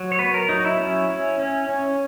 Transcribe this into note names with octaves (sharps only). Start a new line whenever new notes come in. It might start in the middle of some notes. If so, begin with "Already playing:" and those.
Already playing: F#3
C#5
B3 B4
A#4
F#3 D#4
E4
C#4
C#4
C#4
C#4